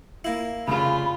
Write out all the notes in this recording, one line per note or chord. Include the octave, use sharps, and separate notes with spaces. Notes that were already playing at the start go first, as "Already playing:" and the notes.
A#3 E4
F1 C#3 F4 B5